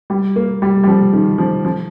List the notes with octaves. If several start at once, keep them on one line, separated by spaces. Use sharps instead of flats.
G3
A#3
G3
G3
F3
D#3
F3
F3